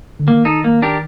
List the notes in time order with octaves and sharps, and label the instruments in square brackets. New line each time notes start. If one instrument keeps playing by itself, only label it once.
[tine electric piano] D3
[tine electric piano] D#3 [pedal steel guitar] A#3
[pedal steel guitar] D#4 A4
A#3
D4 G4 A#4